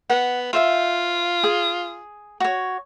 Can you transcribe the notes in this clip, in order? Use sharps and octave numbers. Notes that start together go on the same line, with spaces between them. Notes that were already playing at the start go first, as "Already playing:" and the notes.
B3 F#5
F4 C5 E5 F5
G#4
F#4 C#5